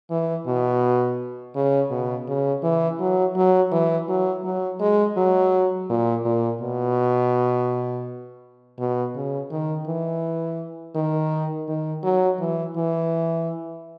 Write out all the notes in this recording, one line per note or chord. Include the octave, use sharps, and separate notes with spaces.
E3
B2
C#3
B2
C#3
E3
F#3
F#3
E3
F#3
F#3
G#3
F#3
A#2
A#2
B2
B2
C#3
D#3
E3
D#3
D#3
F#3
E3
E3